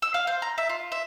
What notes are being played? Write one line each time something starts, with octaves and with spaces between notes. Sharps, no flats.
E6
F5
C5
A#5
E5
F4
E5